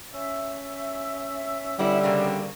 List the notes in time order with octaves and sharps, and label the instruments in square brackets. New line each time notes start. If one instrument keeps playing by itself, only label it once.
[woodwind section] C#4 E5
[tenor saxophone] D3 [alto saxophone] G3 [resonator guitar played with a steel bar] B3 E4
[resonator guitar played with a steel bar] C#3 A#3 C4